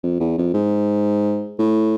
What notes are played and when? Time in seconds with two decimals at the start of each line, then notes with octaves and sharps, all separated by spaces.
0.03 F2
0.20 E2
0.38 F2
0.54 G#2
1.58 A2